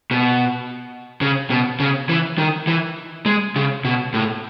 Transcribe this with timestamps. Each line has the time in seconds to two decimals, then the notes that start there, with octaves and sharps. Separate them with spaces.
0.11 B2
1.21 C#3
1.50 B2
1.80 C#3
2.09 E3
2.38 D#3
2.67 E3
3.26 G#3
3.56 C#3
3.85 B2
4.14 A2